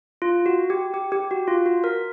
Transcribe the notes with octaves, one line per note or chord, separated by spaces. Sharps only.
F4
F#4
G4
G4
G4
F#4
F4
F#4
A#4